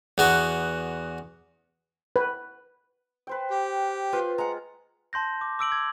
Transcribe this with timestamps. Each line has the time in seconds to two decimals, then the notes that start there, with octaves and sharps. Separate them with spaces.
0.18 E2 B3 F#4
2.16 B4
3.27 B4 C5 G5
3.50 G4
4.13 F4 B4 C5
4.38 G#3 F#5 A#5
5.13 A5 C6 G6 A#6
5.41 D6
5.59 D6 E6 D7 F#7
5.72 G#6